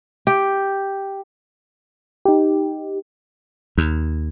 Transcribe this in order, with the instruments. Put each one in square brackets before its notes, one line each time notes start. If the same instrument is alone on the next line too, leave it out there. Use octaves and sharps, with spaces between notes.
[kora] G4
[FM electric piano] D#4 G4
[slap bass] D#2